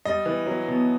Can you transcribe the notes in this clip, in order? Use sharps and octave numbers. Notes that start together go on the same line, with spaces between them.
G3 D#5
E3
F#3
B2